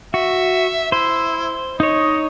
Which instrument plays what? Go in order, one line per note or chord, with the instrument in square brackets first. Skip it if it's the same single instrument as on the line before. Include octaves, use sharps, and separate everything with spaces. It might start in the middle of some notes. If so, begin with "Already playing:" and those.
[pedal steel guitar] F#4 [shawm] E5
[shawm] E4 [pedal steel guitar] C5
[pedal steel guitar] D#4 C#5 [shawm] D#5